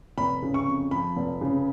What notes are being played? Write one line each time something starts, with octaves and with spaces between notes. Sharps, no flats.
F1 B5
C#3
C#6
F2
F3 B5
F1
C#3